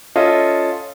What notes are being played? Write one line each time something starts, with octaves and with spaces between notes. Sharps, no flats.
C#4 F4 A4 D#5 E5